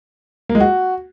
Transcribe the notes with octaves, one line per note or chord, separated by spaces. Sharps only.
A#3
G#3
F#4